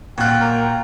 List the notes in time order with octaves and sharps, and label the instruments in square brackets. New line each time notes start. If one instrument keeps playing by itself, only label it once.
[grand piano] A#2 F#6 [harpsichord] F#3 F4 [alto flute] G5
[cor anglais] A#4